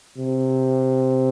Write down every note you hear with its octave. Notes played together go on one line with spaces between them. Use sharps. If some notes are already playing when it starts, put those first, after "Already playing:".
C3